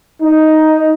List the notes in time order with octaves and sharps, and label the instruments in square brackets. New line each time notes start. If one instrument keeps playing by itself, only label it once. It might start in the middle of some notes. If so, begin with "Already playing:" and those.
[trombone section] D#4